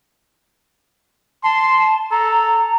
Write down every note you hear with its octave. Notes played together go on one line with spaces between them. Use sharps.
A5 C6
A4 A#5